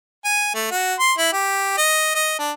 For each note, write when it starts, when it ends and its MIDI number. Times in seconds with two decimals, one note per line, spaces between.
0.25 0.51 80
0.54 0.70 57
0.71 0.94 66
0.99 1.13 84
1.18 1.29 64
1.33 1.76 67
1.77 2.11 75
2.15 2.35 75
2.39 2.51 62